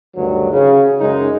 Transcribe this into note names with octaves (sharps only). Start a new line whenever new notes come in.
D2 G2 D#3 F#3
C#3
F#2 C#3 G#3 D#4